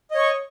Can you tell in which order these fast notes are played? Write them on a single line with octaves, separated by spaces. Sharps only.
D#5 C#5 C#6